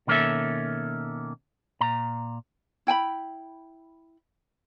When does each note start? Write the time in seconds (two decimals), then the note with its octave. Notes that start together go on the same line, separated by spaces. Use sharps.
0.07 B2 D#3 A#3 C#4 A4 E5
1.81 A#2 A#5
2.87 E4 G5 G#5 B5